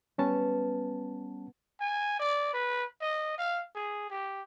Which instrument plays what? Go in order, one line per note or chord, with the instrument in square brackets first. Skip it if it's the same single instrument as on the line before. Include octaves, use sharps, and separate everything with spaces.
[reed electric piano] G3 C#4 A5 [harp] B3
[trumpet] G#5
D5
B4
D#5
F5
G#4
G4